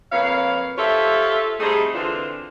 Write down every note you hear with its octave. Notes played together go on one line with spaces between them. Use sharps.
F2 A#3 B4 C#5 F5
F4 G4 A4 C5 C#5 E5
G3 A3 C4 D#4 G#4
D3 E3 C4 D4 F4